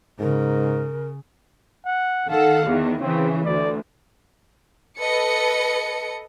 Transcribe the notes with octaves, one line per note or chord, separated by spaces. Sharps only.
G#2 C#3 A#4
F#5
D#3 A4 F5 F#5
E2 D#3
C#3 E3 C4
D2 D5
A4 B4 D#5 C#7